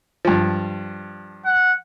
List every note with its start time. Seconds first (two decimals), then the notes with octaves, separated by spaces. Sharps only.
0.25 G2 F3
1.45 F#5